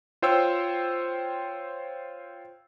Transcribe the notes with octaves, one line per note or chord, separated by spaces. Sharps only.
F4 C5 C#5 G5 E6